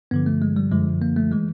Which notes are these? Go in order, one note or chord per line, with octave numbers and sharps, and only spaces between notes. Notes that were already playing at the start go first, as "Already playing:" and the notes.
G2 D3 F3 B3
A3
G#3
G3
F#2 D3 F3 G#3
A#3
A3
E3 G#3